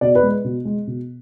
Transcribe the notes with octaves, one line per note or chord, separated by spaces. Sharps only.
B2 D5
B4
G#3
B2
G#3
B2